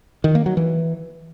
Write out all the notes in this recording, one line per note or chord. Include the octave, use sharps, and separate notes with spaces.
D#3
A#3
F#3
E3